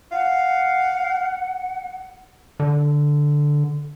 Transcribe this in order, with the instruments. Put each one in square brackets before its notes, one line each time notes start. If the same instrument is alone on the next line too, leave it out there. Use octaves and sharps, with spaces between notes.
[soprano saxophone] F5 [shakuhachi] F#5
[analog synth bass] D3